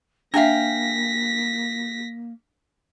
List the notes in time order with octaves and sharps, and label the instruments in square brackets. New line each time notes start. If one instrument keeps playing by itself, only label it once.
[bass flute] A#3 [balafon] D4 E5 [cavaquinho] F5 G5 G#5 [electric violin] A#6 B6